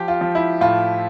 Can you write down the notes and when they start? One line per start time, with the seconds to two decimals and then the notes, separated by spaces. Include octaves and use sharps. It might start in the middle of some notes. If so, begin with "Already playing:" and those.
Already playing: F3 G4
0.08 F4
0.21 F3
0.35 E4
0.61 A2 F4